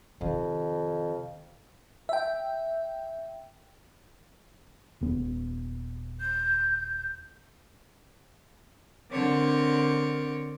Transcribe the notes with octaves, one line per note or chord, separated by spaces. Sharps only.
F2 C3 D#3
E5 G5
D#1 B3
G6
D3 C4 A#4 C#5 D6